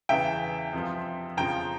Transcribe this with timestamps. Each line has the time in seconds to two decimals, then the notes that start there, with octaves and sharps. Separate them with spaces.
0.09 E2 C#3 E3 E5 G5
0.73 F2 C3 F3
1.37 F2 C#3 F3 G5 A#5